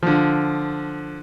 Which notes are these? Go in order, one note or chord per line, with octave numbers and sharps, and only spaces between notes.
D3 F3